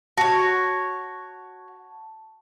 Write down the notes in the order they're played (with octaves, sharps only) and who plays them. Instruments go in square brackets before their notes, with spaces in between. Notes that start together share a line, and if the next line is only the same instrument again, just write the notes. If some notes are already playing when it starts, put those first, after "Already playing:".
[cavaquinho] F#4 C#5 [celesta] A5